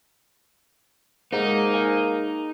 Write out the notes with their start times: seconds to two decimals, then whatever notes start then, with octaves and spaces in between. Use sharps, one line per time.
1.33 G#3 A#3 D#4 C5 F#5 A#5
1.74 F5 G#5